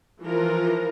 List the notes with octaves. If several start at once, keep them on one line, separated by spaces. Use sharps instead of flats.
E3 F3 F4 A#4